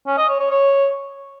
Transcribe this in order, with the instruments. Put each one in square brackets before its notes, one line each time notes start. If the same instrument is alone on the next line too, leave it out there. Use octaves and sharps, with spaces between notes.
[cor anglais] C#4
D#5
C#5
C#5
C#5